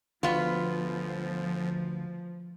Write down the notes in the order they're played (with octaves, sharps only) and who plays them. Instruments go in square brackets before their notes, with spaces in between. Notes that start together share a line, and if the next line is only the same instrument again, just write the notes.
[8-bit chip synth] G1 [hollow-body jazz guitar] D2 [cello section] F3 [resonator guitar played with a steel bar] B3 F4